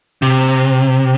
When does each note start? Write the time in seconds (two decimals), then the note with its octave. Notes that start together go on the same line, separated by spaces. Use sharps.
0.22 C3